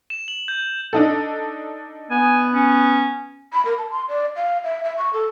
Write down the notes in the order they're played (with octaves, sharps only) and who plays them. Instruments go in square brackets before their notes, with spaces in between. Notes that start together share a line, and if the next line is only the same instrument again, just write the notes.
[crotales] E7
F#7
G6
[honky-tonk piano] D4 D#4 A4
[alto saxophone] B3 [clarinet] G#5
[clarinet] C#4
[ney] B5
A#4
A5
C6
D5
F5
E5
E5
C#6
A4